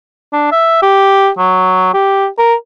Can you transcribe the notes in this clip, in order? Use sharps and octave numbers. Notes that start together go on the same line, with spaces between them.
D4
E5
G4
F#3
G4
A#4